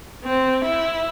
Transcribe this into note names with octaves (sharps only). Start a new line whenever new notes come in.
C4
E4